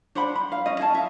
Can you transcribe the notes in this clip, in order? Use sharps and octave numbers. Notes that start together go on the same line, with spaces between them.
D4 C5 F#5 B5
B5
F5
C#4 D#5
G#4 F5 A5
E5 F5